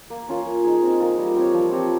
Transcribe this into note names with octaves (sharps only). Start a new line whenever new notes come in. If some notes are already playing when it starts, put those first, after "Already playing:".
A#3
C#4 F4 A#4
A#3
D#4 G#4
C4
F4 A#4
G3
C4 G4 C#5
F3
C4 G4 C#5